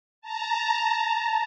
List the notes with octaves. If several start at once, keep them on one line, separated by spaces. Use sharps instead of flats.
A5 A#5